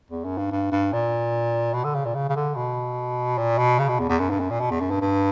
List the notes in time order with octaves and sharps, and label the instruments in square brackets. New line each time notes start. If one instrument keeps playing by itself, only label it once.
[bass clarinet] E2
F#2
G2
G2
G2
A#2
B2
D3
C#3
A#2
C#3
C#3
D3
B2
A#2
B2
C#3
B2
E2
E2
F#2
G2
F#2
A#2
B2
E2
F#2
G2
G2